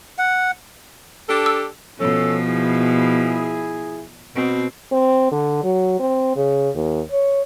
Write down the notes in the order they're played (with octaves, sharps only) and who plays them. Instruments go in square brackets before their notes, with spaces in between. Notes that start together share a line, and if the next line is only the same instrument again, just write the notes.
[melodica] F#5
[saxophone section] D4 G4 A4
[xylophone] E6
[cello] B2 F3 [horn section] C#4 A4
[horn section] E4 G#4
[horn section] B2 [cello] C4
[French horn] C4
D3
F#3
C4
C#3
D#2
C#5